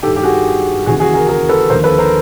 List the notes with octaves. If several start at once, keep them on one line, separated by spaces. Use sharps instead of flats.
G2 D#3 G4 A4
G4
F#4 G#4
D#2 C#3 E3 F#4 G#4
F#4 G#4
G#4 A#4
G#4 A#4
A4 B4
D#2 D3 F3 A#4 C5
A4 B4
A#4 C5